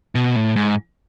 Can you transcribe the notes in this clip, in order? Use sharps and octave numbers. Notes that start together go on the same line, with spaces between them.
B2
A2
G#2